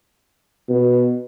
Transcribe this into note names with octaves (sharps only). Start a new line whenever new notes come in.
B2